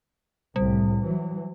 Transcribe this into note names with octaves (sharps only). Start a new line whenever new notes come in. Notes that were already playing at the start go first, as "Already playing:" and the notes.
C2 A2 G3
E3 F#3